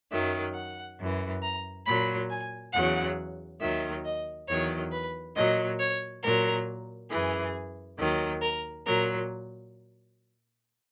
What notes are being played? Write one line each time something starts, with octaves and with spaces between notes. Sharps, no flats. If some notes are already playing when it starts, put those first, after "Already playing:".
F#2 D#3 F#3 E5
F#5
F#2 E3
A#5
A#2 F#3 B5
G#5
E2 C#3 F#3 F#5
D#2 D#3 F#3 E5
D#5
E2 D#3 F#3 C#5
B4
A#2 F#3 D#5
C#5
A#2 F#3 A#4
F#2 E3 G#4
D#2 D#3 F#3
A#4
A#2 F#3 A#4